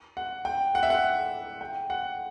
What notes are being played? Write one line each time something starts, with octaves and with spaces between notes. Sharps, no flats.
F#5
G5
F#5
E5
F#5
G5
F#5